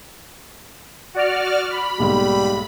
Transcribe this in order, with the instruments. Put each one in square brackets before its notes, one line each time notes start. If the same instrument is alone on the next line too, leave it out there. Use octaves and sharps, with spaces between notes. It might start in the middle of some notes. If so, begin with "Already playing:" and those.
[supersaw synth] F#4 D5 F6
B5
[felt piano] B1 G#2 A#3 [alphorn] G3